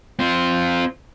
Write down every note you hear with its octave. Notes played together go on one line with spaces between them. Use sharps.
C4 F4